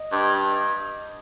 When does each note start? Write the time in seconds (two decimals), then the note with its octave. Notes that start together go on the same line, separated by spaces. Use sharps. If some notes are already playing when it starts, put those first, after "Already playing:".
Already playing: D#5
0.12 G2